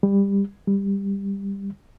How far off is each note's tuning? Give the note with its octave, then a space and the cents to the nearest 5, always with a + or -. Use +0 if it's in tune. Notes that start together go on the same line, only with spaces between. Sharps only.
G3 +20
G3 +15